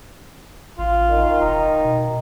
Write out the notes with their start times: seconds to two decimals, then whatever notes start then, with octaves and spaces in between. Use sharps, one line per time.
0.79 A1 F4
1.10 D#3
1.41 E1 D#4
1.85 B2